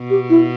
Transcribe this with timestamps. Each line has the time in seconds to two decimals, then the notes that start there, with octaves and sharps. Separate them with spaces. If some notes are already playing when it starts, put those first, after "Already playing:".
Already playing: B2
0.10 G4
0.30 E4